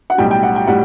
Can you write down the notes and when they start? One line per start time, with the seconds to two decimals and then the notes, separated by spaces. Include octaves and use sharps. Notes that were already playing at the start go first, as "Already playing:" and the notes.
0.10 F#5
0.18 B1 A2 G3 G5
0.31 G5
0.43 F#5
0.56 G5
0.67 A2 G3 F#5